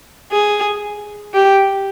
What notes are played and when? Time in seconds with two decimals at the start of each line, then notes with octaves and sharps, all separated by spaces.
0.32 G#4
1.34 G4